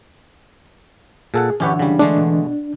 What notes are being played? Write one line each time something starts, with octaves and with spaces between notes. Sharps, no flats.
A#2 G#4 A4 F#5
F#2 D3 E3 C#4 G4 B4 C#5
C#3 G3
D3 G#3 A3 D4
B2